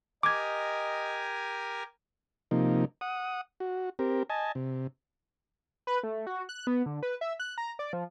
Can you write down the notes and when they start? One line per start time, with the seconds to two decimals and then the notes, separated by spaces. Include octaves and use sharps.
0.23 G4 A#4 D#5 G#5 D6 G#6
2.51 C3 F3 A#3 D#4
3.01 F#5 D#6
3.60 F#4
3.99 C4 G4 A#4
4.30 D#5 G#5 A5
4.55 C3
5.87 B4
6.03 A3
6.27 F#4
6.49 F#6
6.67 B3
6.86 D3
7.03 B4
7.21 E5
7.40 F#6
7.58 A#5
7.79 D5
7.93 F3